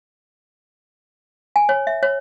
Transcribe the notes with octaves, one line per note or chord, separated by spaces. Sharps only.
G#5
C#5
E5
C#5